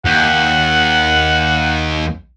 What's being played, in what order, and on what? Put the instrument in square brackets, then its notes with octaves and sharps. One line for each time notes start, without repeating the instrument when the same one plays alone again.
[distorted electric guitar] D#2 [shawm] F#5